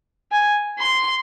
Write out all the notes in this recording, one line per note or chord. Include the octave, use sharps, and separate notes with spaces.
G#5
C6